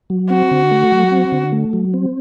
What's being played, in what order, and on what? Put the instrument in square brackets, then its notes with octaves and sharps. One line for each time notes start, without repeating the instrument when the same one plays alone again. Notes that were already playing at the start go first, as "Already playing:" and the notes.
[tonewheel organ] F#3
[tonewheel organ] C4 [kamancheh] F#4
[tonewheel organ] D3
A3
F#3
C4
D3
A3
F#3
C4